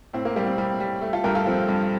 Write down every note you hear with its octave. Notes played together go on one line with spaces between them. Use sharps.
A2 C4
A#3
G3 A#3
C4
G3
G3
A3
F4 A4
G2 G4 A#4
F4 A4
F3 C4
G2